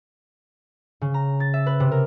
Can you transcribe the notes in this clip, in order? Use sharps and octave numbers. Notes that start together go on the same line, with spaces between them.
C#3
A#5
A6
E5
B4
C3
A#4